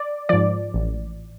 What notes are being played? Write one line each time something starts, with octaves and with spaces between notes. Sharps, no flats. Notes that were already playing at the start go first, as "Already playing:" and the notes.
Already playing: D5
G#2 F3 D5
A1